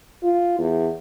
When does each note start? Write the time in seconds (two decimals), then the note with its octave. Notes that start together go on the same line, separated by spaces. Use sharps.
0.23 F4
0.59 E2